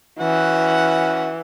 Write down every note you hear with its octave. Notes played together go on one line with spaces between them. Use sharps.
E3 C#4 F#4 F#5